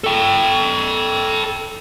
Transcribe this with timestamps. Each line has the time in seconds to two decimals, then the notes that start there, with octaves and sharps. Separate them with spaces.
0.04 A4 G5